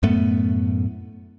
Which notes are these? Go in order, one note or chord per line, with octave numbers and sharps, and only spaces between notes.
F#2 A2 A3 B3